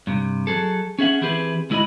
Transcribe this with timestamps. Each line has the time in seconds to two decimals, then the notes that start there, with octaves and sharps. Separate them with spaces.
0.07 G2 C3
0.47 F#3 G#4 A4
0.99 C#4 G#4 E5 F#5
1.21 E3 C4 E4 G4 G#4 B4
1.70 D2 G#3 E4 F#4 D#5 B5